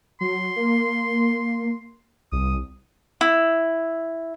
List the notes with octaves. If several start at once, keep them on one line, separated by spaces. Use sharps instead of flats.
F#3 C6
A#3
C2 D#6
E4